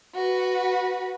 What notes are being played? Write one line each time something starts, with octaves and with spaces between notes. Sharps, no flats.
F#4 B4